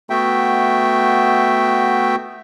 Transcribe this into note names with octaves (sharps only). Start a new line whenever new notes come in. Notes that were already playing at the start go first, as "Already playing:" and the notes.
A3 B3 F#4 E5 G5